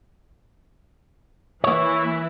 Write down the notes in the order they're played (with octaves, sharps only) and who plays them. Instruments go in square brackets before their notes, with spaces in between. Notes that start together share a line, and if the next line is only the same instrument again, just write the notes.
[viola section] E3 E4 [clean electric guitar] A#3 C#5